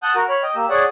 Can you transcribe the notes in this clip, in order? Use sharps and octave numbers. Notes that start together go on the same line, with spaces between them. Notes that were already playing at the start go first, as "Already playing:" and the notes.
F#5 A5 D#6 F#6 G6
F#4 A#4
C#5 B5 F6
D#5 G5
A#3 G4 E6
G#4 C#5 D5 F#5